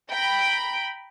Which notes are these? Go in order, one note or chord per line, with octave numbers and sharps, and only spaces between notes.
G5 A#5 B5 D7